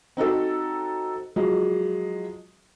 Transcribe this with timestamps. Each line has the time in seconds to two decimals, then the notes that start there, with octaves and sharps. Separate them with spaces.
0.17 C4 D#4 F#4 A4
1.36 F3 F#3 G#3